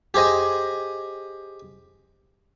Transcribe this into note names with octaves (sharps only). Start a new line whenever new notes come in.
G4 G#4 C5 D#5 G#5